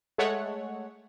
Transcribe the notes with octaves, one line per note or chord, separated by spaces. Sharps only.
G#3 A3 C#5 F#5